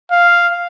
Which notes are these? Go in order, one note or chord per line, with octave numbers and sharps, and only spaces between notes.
F5